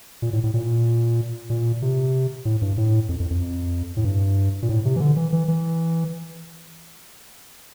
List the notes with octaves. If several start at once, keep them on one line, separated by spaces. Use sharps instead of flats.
A#2
A2
A2
A#2
A#2
C3
A2
G2
A2
F2
F2
F2
A2
G2
A#2
A2
C3
E3
D3
E3
E3
E3